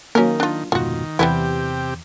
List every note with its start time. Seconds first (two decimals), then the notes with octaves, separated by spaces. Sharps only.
0.15 D#3 F#3 A#3 C#4 A#4
0.40 D4 F4
0.72 F1 G#2 B2 D#3 F4 F#4
1.19 E2 C3 E3 G3 B3 E4 G4